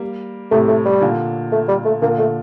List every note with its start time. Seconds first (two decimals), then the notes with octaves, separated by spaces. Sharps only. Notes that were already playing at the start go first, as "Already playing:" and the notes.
Already playing: G3 A#3
0.51 A2 C3 A3
0.68 A3
0.85 G3
1.01 A#2 D3
1.52 A3
1.68 G3
1.85 A3
2.02 A#2 D3 A#3
2.19 A3